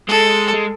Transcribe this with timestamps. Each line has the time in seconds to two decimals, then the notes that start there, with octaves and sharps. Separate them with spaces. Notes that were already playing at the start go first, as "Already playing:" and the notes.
0.09 G#3 A4
0.54 G#3